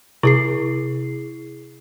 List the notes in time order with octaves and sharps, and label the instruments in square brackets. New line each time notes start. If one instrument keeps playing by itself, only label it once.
[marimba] C3 [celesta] E4 G#4 C7